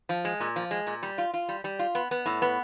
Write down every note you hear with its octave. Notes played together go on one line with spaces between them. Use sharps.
F3
G#3
A#2
F3
G#3
A#2
G3
F4
F4
G3
G3
F4
B3
B3
A2
B3